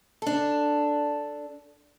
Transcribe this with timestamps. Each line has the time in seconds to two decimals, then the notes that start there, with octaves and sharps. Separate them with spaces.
0.22 D4 A4